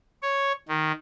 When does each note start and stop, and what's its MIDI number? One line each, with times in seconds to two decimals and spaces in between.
0.22 0.52 73
0.68 0.92 51